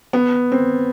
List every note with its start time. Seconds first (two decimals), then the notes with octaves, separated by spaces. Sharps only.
0.13 B3
0.52 C4